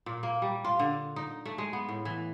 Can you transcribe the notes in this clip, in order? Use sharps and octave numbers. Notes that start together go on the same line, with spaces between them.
A#2
A#3
G3
F4
D3
D#4
A3
G#3
B3
A2
E3